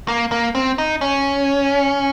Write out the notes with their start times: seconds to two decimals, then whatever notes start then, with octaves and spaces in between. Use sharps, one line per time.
0.08 A#3
0.32 A#3
0.55 C4
0.78 D#4
1.01 C#4